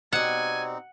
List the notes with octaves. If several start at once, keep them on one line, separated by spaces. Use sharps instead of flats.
B2 G3 C4 D#4 F#5 G#5